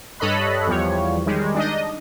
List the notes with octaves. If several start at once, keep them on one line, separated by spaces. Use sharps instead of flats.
G2 A4 C#5 D#5 B5 F#6
E2 F3 G3 C#5
D#3 G3 G#3
D4 D#4 D#5